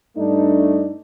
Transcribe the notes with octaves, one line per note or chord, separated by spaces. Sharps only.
G2 A3 D4 D#4